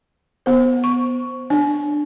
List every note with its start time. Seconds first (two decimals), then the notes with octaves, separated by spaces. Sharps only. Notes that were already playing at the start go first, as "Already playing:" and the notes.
0.46 B3 C5
0.84 C#6
1.50 D4